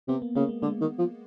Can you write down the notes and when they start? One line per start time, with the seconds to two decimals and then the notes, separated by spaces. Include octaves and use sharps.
0.08 C3 B3
0.22 A#3
0.35 C#3 A#3
0.49 G#3
0.62 D3 G#3
0.81 D#3
0.98 F3